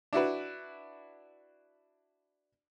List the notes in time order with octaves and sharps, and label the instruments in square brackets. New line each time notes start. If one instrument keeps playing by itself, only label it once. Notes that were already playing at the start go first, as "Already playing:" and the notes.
[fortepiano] D4 E4 F#4 B4